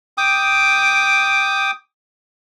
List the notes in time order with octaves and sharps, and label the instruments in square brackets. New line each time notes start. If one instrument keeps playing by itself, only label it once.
[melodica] G5 D6 D#6